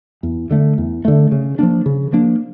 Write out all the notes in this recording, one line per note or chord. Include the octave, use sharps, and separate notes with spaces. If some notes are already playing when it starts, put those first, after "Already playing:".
E2
D3 A3
E2
D3 A3
C#3
F3 A#3 D4
C#3
F3 A#3 D4